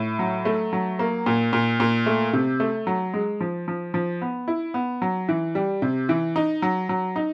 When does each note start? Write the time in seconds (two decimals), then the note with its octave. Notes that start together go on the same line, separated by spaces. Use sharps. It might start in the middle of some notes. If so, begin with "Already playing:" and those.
Already playing: A2
0.19 F#3
0.45 A3
0.73 F#3
0.99 A#3
1.26 A#2
1.53 A#2
1.80 A#2
2.06 A3
2.33 C3
2.60 A3
2.87 F#3
3.14 G#3
3.41 F3
3.68 F3
3.94 F3
4.21 B3
4.48 E4
4.74 B3
5.02 F#3
5.29 E3
5.55 G3
5.82 C3
6.09 E3
6.36 D#4
6.62 F#3
6.89 F#3
7.16 D#4